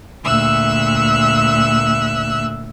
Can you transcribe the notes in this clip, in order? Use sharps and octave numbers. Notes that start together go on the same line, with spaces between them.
D2 A#2 E5 E6 F#6